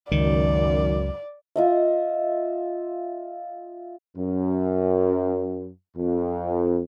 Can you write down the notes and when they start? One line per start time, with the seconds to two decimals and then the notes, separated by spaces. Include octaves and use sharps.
0.12 C#2 F#2 D#3 D5
1.56 F4 D#5 E5
4.17 F#2
5.96 F2